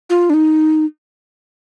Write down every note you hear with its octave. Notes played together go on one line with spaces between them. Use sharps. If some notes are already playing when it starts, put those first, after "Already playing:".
F4
D4
D#4